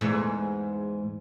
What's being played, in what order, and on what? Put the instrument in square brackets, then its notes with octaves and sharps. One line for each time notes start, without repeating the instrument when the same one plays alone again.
[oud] E2 G#2